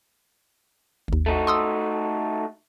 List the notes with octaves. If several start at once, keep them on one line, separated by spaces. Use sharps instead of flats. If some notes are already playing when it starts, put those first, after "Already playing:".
G#1 D#2
A3 D#4 F#4
C6 D#6 E6